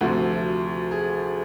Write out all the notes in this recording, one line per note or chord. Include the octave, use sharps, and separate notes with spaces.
D2 C3 F3 F#4
G#4